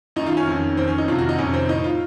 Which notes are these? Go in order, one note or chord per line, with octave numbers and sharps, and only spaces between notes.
F#2 D#3 D#4
F4
C#4
F2 D#3
F2 D#3 C4
C#4
D#4
F2 C3 D#3 F4
F#4
D#4
F2 C3 D#3 C#4
C4
A2 D#4
F4